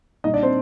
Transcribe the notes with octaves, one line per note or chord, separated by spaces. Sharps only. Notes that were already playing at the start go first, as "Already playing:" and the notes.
A#2 G3 D#4 D#5
D4 D5
C4 C5